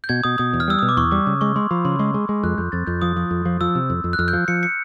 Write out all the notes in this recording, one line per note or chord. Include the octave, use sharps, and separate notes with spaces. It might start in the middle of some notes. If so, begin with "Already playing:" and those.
G6
B2 G#6
B2 D#6
B2 D#6
E2
F6
G3 E6
B2 D#6
D6
E2 C#6
G3 D6
C#3 D#6
G#3 C#6
G#3 C6
F3 B5
C#3 C6
G#3 C#6
G#3
G#3
F2 F#6
F2 G6
F2 A6
F2 G6
F3 D#6
F3 D#6
F2
F3
F3 E6
C3
F2
F2
F#6
F2 F6
G6
F3
F3 C#7
C#7